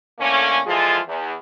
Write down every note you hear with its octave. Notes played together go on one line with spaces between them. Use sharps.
A2 D3 A#3 C#4
E3 F3 G#3 F4 G#4 A4
E2